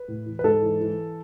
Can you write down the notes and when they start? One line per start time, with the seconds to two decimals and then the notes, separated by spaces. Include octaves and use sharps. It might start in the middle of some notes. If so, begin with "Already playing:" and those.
Already playing: B4
0.08 A2
0.26 E3
0.39 B4
0.44 G#2 A4
0.62 E3
0.80 E3